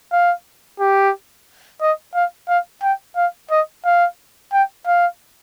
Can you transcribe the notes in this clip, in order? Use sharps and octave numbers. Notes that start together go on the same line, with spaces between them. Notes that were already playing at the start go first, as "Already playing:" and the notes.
F5
G4
D#5
F5
F5
G5
F5
D#5
F5
G5
F5